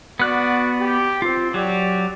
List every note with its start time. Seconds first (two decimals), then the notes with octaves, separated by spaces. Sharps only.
0.20 B3 F#4 D5 F#6
0.80 G4
1.22 C4 F4
1.54 F#3 G4 D5